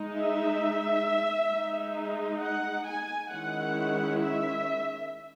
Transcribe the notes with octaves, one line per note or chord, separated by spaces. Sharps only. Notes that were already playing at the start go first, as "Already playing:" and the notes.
Already playing: G#3 D#4
E5
G#3 D#4
F#5
G#5
D#3 G#3 C#4 E4 F#5
E5